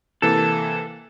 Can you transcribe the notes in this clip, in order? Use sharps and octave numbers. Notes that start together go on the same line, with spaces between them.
C3 E3 A#3 A4